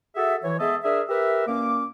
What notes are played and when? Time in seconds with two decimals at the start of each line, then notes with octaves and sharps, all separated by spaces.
0.16 F#4 G#4 A4 E5
0.44 E3 C#5
0.60 G#3 B3 G#4 A4 D#5 E5
0.84 D4 G#4 A#4 E5
1.09 G4 A#4 B4 E5
1.48 A#2 A#3 C#4 D6